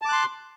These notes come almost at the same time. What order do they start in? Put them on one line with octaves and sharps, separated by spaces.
A5 D6 F#6 C6